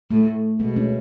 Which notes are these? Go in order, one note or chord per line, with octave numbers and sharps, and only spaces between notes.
A2 A3
B2 G#3 B3
A3 C#4